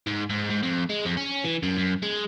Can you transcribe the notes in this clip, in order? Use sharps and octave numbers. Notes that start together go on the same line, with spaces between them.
G#2
G#2
G#2
F2
G#3
F2
C#4
E3
F#2
F#2
G#3